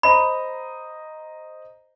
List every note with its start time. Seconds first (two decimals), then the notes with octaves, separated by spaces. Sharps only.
0.03 C5 D#5 A#5 B5